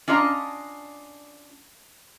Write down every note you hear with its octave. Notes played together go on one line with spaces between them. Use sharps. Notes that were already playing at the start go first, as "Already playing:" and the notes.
C#4 D4 F4 D#5 A#5